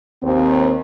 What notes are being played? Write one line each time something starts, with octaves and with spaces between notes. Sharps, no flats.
D#2 C4